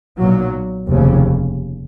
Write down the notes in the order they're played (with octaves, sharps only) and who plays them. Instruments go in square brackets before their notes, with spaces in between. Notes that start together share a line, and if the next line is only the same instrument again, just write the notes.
[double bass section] B1 A#2 F#3
F1 D#2 C#3